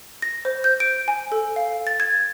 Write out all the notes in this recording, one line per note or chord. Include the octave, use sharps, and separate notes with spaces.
A#6
C5
G6
D7
G#5
A4
F5
A6
G#6